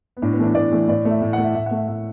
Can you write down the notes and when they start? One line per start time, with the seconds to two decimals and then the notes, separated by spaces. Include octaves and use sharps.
0.17 B3
0.22 A2 D4
0.33 B3
0.38 E3 A3 D4
0.55 A2 D5
0.72 E3 A3
0.88 A2 D5
1.05 A3
1.11 E5
1.22 A2
1.33 F#5
1.38 A3
1.44 E5
1.55 A2 E5
1.66 A3 F#5
1.77 E5
1.88 A2 E5